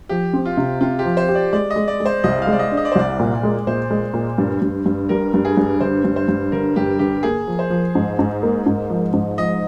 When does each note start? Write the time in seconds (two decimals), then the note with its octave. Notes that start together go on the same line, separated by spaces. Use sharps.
0.09 F3 G4
0.33 C4
0.45 F4
0.57 C3
0.81 C4 F4
0.99 G4
1.05 F3
1.17 C5
1.29 G4
1.35 D5
1.53 G#3 D5
1.70 D#5
1.76 G#3
1.88 D5
2.00 G#3
2.06 C5
2.24 C2 D#5
2.42 F5
2.47 G#3
2.52 D5
2.59 D#5
2.71 D4
2.77 D#5
2.85 D5
2.92 C5
2.95 C2 D5
3.19 A#2
3.43 G#3
3.67 A#2 C5
3.91 G#3
4.14 A#2
4.38 G2
4.62 G2
4.86 G2
5.09 G3 A#4
5.34 G2
5.45 G#4
5.57 G2
5.81 D3 C5
6.04 G2
6.16 C5
6.28 G2
6.52 D3 A#4
6.76 G2 G4
6.99 D3 G4
7.23 A#3 G#4
7.48 F3
7.59 C5
7.70 F3
7.95 G#2
8.19 G#2
8.43 A#3
8.66 G#2
8.90 F3
9.13 G#2
9.38 F3 D#5